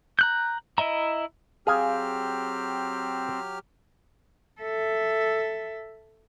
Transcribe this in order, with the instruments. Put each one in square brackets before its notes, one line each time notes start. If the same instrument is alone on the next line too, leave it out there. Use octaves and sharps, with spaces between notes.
[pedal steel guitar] A#5 F#6 G6
E4 D#5 E5 A#5
[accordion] F#3 G4 F6 [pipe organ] C4 [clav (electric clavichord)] G#4 F5 G#5
[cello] A4 E5